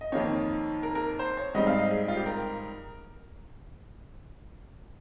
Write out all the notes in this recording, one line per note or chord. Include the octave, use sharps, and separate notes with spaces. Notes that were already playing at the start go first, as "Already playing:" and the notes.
D#5
F2 D#3 A#3 D#4 C#5
A#4
A#4
C5
C#5
G#2 G3 C4 D#4 D#5
F5
D#5
G#4
F4
G4
A#4